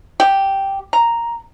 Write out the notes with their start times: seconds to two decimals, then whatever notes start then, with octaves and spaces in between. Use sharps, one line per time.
0.20 G4
0.93 A#5